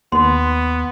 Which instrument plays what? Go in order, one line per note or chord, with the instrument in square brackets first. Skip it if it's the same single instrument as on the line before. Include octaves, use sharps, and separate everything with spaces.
[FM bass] D#2 [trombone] B3 [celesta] C6